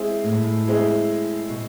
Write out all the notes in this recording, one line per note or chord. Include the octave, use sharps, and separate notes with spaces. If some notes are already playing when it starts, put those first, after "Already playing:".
Already playing: G#3 C4 E4 G#4
A2
G#2
A2
G#3 C4 E4 G#4
B2